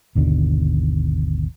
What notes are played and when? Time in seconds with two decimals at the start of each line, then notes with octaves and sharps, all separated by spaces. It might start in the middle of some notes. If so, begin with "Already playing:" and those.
0.15 G#1 D#2 B2 D3